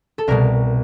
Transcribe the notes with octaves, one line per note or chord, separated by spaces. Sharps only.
A4
C2 B2 G3 A#4